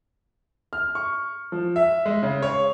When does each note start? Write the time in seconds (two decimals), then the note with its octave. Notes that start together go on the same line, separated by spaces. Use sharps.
0.73 F6
0.95 C#6
1.52 F3
1.76 E5
2.06 G#3
2.23 C#3
2.42 C#5